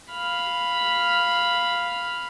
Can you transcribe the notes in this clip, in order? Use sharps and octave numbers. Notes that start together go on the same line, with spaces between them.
F5 B5